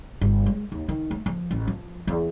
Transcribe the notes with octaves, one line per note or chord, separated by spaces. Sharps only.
G1
G#3
D#2
D#3
A3
F3
A1
F3
E2